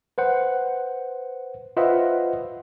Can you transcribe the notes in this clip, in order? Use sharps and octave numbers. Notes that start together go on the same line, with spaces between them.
B4 C5 F#5
F4 B4 C5 D#5 E5 F#5